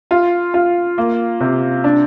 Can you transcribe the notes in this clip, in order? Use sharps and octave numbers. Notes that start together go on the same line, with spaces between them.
F4
F4
A#3
C3
D4